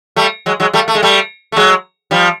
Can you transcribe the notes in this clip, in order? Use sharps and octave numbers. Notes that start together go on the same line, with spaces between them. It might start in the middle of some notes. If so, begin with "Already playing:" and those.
G3 A3
F#3 G#3
F#3 G#3
G3 A3
A3
G#3
G3 A3
A3
F#3 G#3
F3 G3